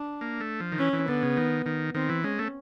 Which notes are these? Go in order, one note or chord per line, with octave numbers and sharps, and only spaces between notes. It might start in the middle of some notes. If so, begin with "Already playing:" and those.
Already playing: D4
A#3
A3
F3
D#3
E3 C#4
E3
D3 B3
C#3
D#3
D#3
D#3 C4
E3
G#3 C#4
A3